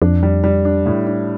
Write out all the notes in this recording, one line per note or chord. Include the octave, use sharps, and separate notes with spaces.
F2 D4
G3
G3
D4
A2
D4